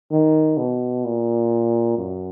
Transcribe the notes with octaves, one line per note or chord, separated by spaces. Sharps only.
D#3
B2
A#2
F#2